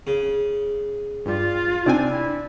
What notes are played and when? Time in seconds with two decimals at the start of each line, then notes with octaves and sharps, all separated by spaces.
0.07 C#3
1.26 G2 G3 F4
1.86 C3 C4 D4 G#5
2.08 E4